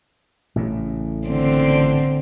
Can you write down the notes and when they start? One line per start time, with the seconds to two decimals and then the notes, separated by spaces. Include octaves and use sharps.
0.56 A1 A2 C#3
1.28 D3 C4